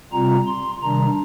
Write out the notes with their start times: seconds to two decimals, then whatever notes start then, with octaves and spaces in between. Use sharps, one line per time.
0.12 C3 G3 C4 F4 A#5
0.47 C6
0.82 C3 D#3 G3 D4 A#5